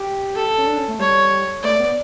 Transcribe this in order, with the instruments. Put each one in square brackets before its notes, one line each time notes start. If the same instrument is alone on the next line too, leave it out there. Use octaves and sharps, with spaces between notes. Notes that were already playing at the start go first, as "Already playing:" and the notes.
Already playing: [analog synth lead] G4
[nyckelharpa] A4
[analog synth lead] C#4
D4
C#4
A3
[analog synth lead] G3 [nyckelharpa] C#5
[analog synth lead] A3 [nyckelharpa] D5
[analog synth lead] B3